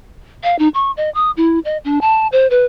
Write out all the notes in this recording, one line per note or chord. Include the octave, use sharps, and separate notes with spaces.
F5
D#4
C#6
D#5
D#6
E4
D#5
D4
A5
C5
B4